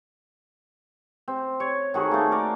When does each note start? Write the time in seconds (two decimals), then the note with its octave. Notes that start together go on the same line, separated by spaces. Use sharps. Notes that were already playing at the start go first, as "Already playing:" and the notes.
1.28 C4
1.60 C#5
1.94 D#3 F#4 G#4 A4
2.11 A3 A#3
2.32 A#4 D5